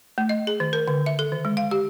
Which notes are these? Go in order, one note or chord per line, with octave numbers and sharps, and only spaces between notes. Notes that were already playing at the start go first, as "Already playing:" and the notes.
A3
D#5
G#4
D#3
A#4
D3
E5
A4
D#3
G#3
F5
G4